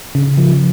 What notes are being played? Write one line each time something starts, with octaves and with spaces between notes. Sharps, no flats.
C#3
F3